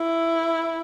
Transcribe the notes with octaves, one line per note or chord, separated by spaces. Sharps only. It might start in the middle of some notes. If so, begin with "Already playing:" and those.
Already playing: E4